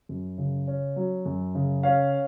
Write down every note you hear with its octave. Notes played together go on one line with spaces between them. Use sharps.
F#2
C#3
C#4
F#3
F#2
C#3
C#4 F5